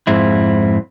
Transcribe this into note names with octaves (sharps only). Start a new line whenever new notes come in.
F2 G#2 C4 E4